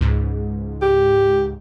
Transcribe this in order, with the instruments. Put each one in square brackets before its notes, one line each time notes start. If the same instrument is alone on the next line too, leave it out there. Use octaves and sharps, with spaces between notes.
[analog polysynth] C#2 G#2
[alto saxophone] G4